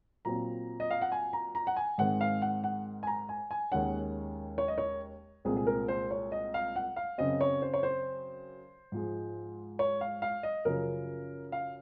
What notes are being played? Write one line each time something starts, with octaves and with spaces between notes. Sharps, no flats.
A#2 F#3 C4 A#5
D#5
F5
F#5
G#5
A#5
A#5
F#5
G#5
G#2 D#3 G#3 C4 F#5
F5
F#5
F#5
G#5
A#5
G#5
G#5
D#2 D#3 G#3 C#4 F#5
C#5
D#5
C#5
C2 A#2 G#3 C4 G#4
G#4
A#4
C5
C#5
D#5
F5
F#5
F5
F#2 C#3 F#3 C4 D#5
C#5
C5
C#5
C5
G#2 F3 G#3
C#5
F5
F5
D#5
F#2 C#3 F3 A#4
F5